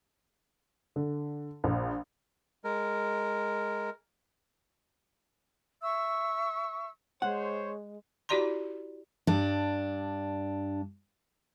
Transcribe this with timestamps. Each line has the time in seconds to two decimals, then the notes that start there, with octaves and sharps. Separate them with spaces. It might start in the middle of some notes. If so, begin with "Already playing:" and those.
0.96 D3
1.64 A#1
2.64 G#3 A#4
5.82 E5 C#6 E6
7.22 G#3 C5 C#5 F#5
8.29 E4 F#4 G4 D5 A#5 C6
9.27 G2 D4